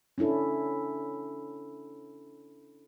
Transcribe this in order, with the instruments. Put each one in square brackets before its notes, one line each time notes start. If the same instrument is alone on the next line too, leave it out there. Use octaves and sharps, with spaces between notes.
[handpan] C#4 D4 E4 A4